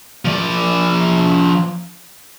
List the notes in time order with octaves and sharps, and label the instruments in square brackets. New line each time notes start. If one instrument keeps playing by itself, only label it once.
[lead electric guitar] F3 D5